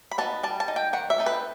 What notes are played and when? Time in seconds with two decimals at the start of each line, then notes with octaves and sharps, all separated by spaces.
0.11 B5
0.18 B3 D#4 A5
0.43 G3 A5
0.60 A5
0.68 D#4
0.76 G5
0.93 D#3 F#5
1.10 E5
1.18 A3 C4 D#4
1.26 B4